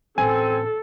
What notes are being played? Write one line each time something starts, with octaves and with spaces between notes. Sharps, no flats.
A1 C4 A4 G#5